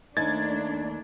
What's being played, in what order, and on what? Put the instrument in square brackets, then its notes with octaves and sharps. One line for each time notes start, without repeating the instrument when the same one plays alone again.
[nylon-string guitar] D#2 [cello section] A3 D4 [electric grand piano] G#6 A6